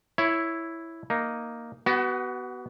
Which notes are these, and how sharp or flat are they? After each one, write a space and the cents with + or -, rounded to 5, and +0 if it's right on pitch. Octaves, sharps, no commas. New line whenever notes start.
E4 +0 C#5 +0
A#3 +0 D#4 +0
B3 +0 F#4 +35